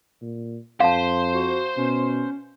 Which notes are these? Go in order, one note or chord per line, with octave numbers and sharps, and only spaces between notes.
A#2
F2 C5 F5 A5
F#4
B2 C#4